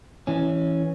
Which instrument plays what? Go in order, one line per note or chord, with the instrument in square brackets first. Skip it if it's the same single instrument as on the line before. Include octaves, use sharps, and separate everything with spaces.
[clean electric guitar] E3 C#4